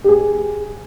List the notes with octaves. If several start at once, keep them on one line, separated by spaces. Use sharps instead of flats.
G4
G#4